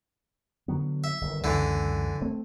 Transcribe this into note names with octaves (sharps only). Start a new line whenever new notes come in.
D3 F#3 B3
E5
G1 C3 D#3
C#2 F#2 D3 E3
A3 C4